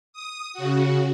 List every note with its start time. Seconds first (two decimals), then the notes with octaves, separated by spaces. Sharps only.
0.13 D#6
0.53 C#3 F#4